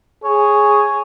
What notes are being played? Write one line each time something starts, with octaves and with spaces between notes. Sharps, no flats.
G#4 C#5